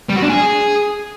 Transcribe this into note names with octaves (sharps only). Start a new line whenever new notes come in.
G3
F#4
D4
G#4